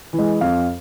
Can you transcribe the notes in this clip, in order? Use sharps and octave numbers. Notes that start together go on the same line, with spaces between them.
E3
G#3
F2 F5